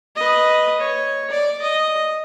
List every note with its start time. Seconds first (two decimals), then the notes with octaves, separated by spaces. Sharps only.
0.16 B4 D#5
0.80 C#5
1.30 D5
1.62 D#5